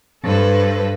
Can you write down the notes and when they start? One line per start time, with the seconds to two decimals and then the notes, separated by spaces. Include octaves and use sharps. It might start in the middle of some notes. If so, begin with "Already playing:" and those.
0.23 G2 A4 B4 C5